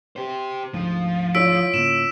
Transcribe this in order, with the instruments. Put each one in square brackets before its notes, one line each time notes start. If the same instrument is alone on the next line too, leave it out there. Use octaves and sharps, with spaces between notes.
[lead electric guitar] G4 C5
[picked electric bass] D2 G#2 [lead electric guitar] F3
[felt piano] E4 F4 C#5 [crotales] E6 B6 D7
[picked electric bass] G#2 C#3 A#3 [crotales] E7